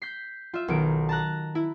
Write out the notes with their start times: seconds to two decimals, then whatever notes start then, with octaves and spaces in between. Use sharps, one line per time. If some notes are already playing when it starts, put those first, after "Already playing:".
0.02 G6 B6 C7
0.54 F4 E5
0.68 B1 D#3 B3 D7
1.09 A5 A#5 F#6
1.55 E4